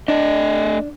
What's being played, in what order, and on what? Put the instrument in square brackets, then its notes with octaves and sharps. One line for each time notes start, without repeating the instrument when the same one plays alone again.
[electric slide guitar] A3 D#5 [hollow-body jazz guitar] D4